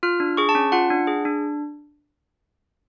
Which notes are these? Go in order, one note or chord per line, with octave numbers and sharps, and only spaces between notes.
F4 F6
D4
G#4 C#6
A5
C#4
F4 F#5
D4
G#4
D4